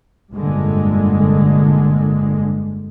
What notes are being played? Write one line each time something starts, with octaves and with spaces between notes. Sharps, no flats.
F1 G2 A#2 D3 G#3